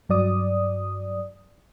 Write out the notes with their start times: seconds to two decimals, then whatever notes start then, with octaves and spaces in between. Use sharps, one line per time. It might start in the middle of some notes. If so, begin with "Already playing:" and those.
0.09 G2 F#3 D5 D#6